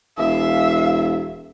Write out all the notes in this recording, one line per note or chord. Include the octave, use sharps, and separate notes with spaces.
E1 E5 F5